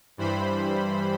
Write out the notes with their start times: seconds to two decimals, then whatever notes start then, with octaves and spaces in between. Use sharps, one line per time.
0.17 G2 E3 G3 C5 B5